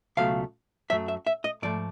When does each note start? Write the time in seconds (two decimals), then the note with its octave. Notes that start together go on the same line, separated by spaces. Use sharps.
0.17 C#2 B2 F#3 A3 F5
0.90 F#2 D#3 F#3 A3 E5
1.08 E5
1.27 E5
1.44 D#5
1.62 G#2 F3 A3 D5